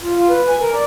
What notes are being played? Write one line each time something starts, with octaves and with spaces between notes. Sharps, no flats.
F4
F4
B4
G#5
A#4
D5